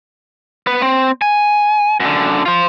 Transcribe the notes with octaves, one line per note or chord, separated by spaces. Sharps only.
B3 B4
C4
G#5
F#2 D3
F4 C5